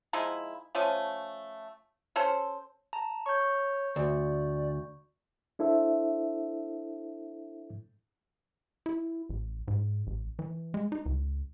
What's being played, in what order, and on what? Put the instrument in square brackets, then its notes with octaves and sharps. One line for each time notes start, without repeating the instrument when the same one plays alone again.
[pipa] F3 G#3 D#4 E4
F3 A3 C#4
C#4 A4 C5
[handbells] A5 A#5
[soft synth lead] C#5 [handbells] C#6 G6
[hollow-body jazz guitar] D2 [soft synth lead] D5
[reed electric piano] D4 E4 A4 C5 E5
[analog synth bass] E4
A1
G#2
A1
E3
G#3
D#4
C#2